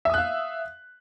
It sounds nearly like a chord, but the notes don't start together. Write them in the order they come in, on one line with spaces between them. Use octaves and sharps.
E5 D#6 F#6 F5